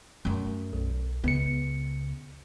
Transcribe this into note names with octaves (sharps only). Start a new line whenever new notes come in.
F#2 A3
B1
C#2 C#3 B3 C#7